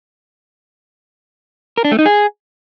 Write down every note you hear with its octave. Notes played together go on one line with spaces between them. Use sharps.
A#4
D4
A3
D#4
G#4